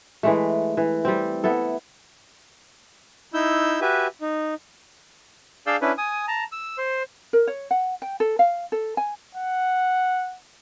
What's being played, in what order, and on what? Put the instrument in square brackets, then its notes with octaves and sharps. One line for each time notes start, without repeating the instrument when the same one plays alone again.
[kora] E3 G#3 A3
E3
G3 C4
B3 E4 A4
[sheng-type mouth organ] D#4 E4 E6 G6
F#4 G4 B4 E5 G#5
D#4
D4 G#4 D5 F5 E6 G6
C#4 D4 E4 B4
G#5 D#6
A5 A#5
E6
C5
[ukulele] A#4
C#5
F#5
G5
A4
F5
A4
G#5
[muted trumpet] F#5